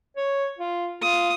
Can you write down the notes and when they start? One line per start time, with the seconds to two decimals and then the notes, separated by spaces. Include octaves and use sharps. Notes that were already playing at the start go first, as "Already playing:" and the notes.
0.16 C#5
0.59 F4
1.02 F4 D#6